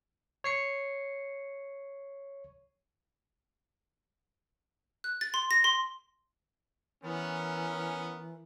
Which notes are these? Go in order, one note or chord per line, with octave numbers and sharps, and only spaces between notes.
C#5 C7 C#7
F#6
A6
C6
A#6
C6
E3 B3 C#4 A#4